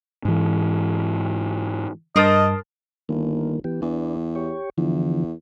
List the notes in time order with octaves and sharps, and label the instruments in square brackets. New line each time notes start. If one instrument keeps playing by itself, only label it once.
[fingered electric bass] G#2 E3
[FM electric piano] G2 A5 [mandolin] A#4 C5 D#6 [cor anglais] D#5
[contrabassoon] G1 [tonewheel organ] D#3 A#3
[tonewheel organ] E3 B3 G4
[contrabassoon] E2 [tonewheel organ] B3 D4
[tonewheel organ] G4 C#5
[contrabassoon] E2 [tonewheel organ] D3 E3 F3